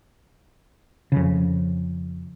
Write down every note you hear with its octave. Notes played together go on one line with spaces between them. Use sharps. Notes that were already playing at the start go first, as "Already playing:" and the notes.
F2 C#3